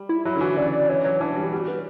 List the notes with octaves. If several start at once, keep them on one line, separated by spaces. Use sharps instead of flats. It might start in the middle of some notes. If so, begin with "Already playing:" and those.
Already playing: G3
E4
F#3 E4
D3
E3 F#4
C#3 D5
D5
E3 C#5
F#3 C#5
E3 D4
G3
G4
G3 F#4
B4